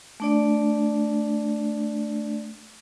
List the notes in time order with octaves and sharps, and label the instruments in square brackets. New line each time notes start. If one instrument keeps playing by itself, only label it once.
[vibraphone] A3 D4 D5